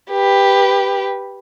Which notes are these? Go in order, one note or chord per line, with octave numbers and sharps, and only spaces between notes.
G4 B4